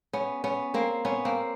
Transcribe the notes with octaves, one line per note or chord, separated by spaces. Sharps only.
B3 C#4
B3 C#4
A#3 C4
B3 C#4
A#3 C4